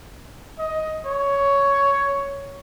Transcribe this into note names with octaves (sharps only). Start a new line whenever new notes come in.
D#5
C#5